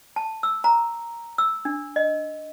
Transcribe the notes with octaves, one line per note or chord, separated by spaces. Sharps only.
A5
E6
A#5
E6
D4
D#5